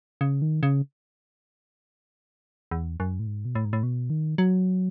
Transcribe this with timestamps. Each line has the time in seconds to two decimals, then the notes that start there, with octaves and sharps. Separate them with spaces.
0.21 C#3
0.42 D#3
0.63 C#3
2.71 E2
3.00 F#2
3.19 A2
3.27 G#2
3.45 B2
3.55 A2
3.65 G#2
3.73 A2
3.83 B2
4.10 D#3
4.38 F#3